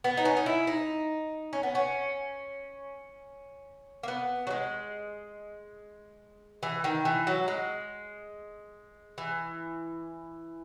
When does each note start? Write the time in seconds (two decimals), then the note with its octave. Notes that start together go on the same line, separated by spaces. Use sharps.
0.04 B3
0.17 D#4
0.25 C#4
0.37 D#4
0.46 E4
0.67 D#4
1.53 C#4
1.63 B3
1.75 C#4
4.03 A#3
4.08 B3
4.47 F#3
4.50 G#3
6.63 E3
6.84 D#3
7.05 E3
7.27 F#3
7.48 G#3
9.18 E3